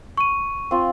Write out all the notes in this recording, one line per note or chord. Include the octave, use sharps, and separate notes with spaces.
C#6 D#7
C4 F4 C6